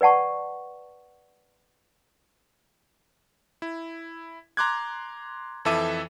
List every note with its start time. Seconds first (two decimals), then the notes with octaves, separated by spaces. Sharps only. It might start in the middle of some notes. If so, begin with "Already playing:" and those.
0.01 B4 D5 F#5 A5 C#6
3.62 E4
4.57 A#5 C6 D6 F#6 G#6
5.65 F2 E3 A4 E5 D6 D#7